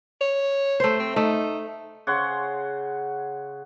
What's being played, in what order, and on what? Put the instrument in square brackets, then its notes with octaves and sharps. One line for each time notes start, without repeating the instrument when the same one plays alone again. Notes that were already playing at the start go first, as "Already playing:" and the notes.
[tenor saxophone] C#5
[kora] A3 C5
[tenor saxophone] C4
[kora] A3 [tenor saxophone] D#4
[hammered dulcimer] C#3 C#5 F#5 C6